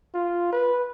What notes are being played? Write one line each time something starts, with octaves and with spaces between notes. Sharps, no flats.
F4
B4